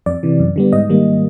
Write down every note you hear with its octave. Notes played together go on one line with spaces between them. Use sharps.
F2 D5
C3 E3
F#2
D3 G3 B3
G#2 D#5
D#3 G3 A#3